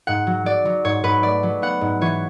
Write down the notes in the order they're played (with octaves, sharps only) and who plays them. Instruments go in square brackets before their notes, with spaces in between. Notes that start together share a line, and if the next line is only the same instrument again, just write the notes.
[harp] G#2 F#5
F#3
F#3 D5
F#3
G#2 C#5
G#2 B4
A3 D5
F#3
B3 F#5
G#2
E3 C#5